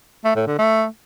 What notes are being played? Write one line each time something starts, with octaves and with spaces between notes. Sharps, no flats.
A3
A2
D3
A3